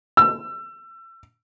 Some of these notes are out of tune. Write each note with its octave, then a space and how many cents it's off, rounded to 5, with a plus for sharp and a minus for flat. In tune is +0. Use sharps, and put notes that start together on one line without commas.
E6 +30